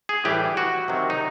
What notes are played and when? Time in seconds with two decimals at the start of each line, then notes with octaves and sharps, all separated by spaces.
0.09 G#4
0.25 A2 E3 G3 G4
0.57 F#4
0.88 C3 D#3 F#3
1.10 D#4